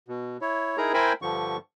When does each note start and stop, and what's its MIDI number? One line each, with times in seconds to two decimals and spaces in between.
0.08 0.37 47
0.41 0.77 64
0.41 0.77 73
0.77 0.92 63
0.77 0.92 64
0.77 0.92 68
0.77 0.92 70
0.77 0.92 82
0.94 1.13 64
0.94 1.13 70
0.94 1.13 72
0.94 1.13 79
0.94 1.13 80
0.94 1.13 83
1.22 1.57 43
1.22 1.57 50
1.22 1.57 53
1.22 1.57 85